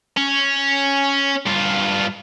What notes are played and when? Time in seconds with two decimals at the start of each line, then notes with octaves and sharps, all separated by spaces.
0.17 C#4
1.47 G2 F4